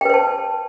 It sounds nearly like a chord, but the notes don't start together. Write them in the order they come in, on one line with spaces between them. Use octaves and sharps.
G5 B4 C5 A5